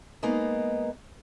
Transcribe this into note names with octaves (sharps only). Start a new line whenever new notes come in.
G#3 A#3 B3 D#4